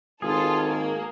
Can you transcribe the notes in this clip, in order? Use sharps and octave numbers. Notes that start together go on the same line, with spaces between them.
G#1 F4 G#4 A4
A#3